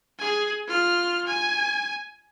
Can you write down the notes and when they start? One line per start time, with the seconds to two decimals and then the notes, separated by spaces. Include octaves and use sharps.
0.19 G#4 G#5
0.67 F4 F6
1.27 G#5